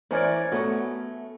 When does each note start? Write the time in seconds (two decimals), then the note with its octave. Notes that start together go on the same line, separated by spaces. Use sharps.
0.11 E3 C#4 A#4 C5 D5 G#5 G#6
0.52 A3 B3 C#4 F#4 A4